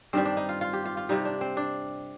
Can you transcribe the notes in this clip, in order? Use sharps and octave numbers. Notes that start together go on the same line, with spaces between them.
G2 D#3 G3 C4
D4
D#4
F4
F4
G4
F4
F4
C3 G3 D#4
D4
C4
D4